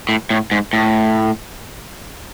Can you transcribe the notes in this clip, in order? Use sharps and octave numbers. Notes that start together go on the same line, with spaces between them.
A2
A2
G#2
A2